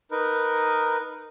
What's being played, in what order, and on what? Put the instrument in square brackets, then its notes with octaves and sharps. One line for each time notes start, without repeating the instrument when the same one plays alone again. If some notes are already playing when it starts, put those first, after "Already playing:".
[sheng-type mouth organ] D#4 A#4 B4